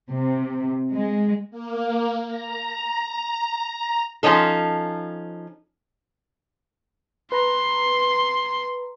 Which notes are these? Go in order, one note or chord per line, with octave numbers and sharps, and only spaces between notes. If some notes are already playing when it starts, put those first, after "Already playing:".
C3
G#3
A#3
A#5
F3 C#4 D#4 A4
B4 A#5 C6